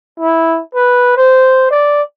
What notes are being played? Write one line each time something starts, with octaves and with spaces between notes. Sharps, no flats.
E4
B4
C5
D5